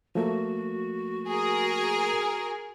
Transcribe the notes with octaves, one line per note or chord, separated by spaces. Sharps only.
F3 A3 A#3 F#4
G#4 A#4